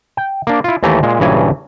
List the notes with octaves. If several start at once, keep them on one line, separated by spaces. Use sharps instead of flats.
G5
A#3 D4
E4 F4
D#2 E3 A3 G4 A#5
A#2 G#3
A#1 G2 C#3 E3 F#3 G#5